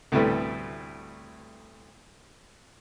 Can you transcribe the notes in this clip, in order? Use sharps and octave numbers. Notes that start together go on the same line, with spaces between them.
D2 A2 C3 G3 A3 B3